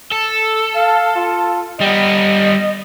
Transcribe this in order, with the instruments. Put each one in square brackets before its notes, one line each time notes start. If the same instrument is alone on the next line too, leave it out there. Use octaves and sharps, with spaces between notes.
[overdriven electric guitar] A4
[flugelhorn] F5
F4
[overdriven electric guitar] G3 B3 [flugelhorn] D#5